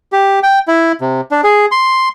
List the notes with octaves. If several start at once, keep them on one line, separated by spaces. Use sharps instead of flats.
G4
G5
E4
C3
D4
G#4
C6